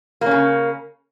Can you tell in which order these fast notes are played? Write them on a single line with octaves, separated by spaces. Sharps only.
A#3 C#4 C#3